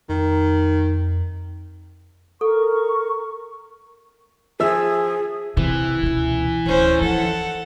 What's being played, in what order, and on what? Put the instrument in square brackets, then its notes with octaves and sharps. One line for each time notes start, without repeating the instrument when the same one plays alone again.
[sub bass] F2 [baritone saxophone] D#3
[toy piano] A4 [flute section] A#4 C#6
[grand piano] F3 E5 E6 [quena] G#4
[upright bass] C3 [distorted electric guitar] E3
[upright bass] C#2 B2
[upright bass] D1 [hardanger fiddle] C#4 C5
[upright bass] F3 [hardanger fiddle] A4 F#5